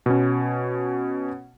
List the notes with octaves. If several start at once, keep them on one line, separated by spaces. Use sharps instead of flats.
B2 C#4